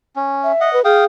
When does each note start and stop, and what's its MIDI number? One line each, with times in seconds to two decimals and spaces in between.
0.16 0.52 61
0.44 0.72 76
0.61 0.79 75
0.61 0.79 78
0.73 0.82 71
0.85 1.06 68
0.85 1.05 77
0.85 1.05 79
0.85 1.05 87